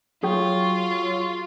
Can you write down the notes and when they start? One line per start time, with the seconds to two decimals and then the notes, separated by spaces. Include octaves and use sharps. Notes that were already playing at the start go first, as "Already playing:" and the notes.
0.23 F#3 F4 G#4 G5 C#6